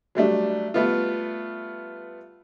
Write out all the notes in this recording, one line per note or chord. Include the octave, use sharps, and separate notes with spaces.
F#3 G3 A3 D4
G3 A3 B3 F4